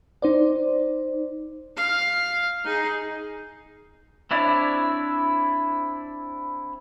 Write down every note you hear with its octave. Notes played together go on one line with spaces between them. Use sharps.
D#4 C5 D5
F5
D#4 G#4
C4 D4 E4 C#5 D5